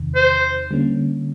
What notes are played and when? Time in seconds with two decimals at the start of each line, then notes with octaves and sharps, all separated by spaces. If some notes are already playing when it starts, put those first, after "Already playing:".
Already playing: E2 C3 D#3
0.15 C5
0.71 D3 G3 A#3 C#4